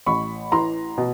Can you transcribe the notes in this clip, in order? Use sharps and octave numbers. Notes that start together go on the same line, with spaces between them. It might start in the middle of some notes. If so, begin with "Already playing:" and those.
A1 B5 C#6
E3 A#5 C6
B2